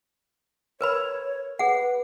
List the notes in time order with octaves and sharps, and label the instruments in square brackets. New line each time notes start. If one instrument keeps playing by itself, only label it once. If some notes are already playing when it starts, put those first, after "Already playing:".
[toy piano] A#4 B4 B5 [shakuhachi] C#5
[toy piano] G#4 F#5 [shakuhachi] B4